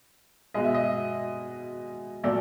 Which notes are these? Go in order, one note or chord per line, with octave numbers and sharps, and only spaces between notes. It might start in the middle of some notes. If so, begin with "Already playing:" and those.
B2 G#3 D#5
E5
D#5
A#2 F#3 A3 D5